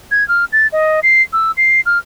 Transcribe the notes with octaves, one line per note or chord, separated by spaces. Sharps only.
G#6
F6
A6
D#5
C7
E6
C7
F6